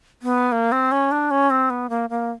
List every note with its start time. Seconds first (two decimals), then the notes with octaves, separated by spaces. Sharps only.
0.22 B3
0.52 A#3
0.72 C4
0.92 C#4
1.11 D4
1.31 C#4
1.50 C4
1.70 B3
1.90 A#3
2.10 A#3